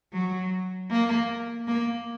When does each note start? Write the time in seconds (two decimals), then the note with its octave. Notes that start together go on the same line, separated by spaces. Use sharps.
0.13 F#3
0.91 A#3
1.68 A#3